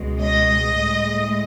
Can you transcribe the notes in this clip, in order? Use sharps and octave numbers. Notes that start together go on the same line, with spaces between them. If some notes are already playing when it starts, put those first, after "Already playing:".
Already playing: C#2 B2 G#3
D#5
A2 G#3